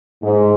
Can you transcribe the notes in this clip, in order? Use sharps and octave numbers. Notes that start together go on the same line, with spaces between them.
G#2